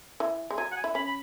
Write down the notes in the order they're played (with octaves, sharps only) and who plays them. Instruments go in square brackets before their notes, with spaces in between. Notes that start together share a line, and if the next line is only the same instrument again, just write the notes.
[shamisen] E3
G#3
[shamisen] F#3 [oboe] G#5
[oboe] F#5
G#5
[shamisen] E4
[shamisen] C#4 [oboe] B5
[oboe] B5